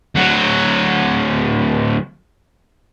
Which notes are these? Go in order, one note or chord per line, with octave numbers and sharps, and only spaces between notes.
D2 F#3